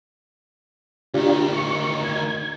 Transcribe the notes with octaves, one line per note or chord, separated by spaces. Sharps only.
D2 D#3 D4 F4 G4
C#6
G#6